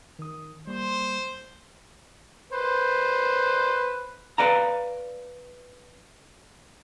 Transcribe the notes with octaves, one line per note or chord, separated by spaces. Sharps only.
D#3 D#6
G3 A#3 C5 C6
B4 C5
B4 D5 F5 A#5